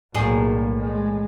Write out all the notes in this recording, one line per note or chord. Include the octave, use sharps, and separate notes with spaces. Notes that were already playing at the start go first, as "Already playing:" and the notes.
B1 E2 A2 G3 A#3 G#4
G#3